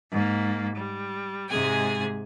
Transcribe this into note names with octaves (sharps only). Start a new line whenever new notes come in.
G#2 A#3
G3
G#2 C3 G#3 G#4 G#5